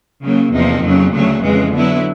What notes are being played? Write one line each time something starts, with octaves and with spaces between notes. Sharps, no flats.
C#3 F#3 A#3
E2 C3 F3 A#3 D#4
F2 C#3 F#3
D2 C#3 F#3 A3
F2 C#3 E3 G#3
D3 F#3 B3 E4